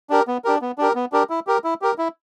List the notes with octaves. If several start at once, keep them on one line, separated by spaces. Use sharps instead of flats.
D4 G4 A#4
B3
D4 G4 A#4
B3
D4 G4 A#4
B3
D4 G4 A#4
E4
G4 A#4
E4
G4 A#4
E4